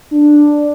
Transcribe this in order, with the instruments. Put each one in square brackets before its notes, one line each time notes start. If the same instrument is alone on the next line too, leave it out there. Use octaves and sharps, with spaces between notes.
[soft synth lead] D4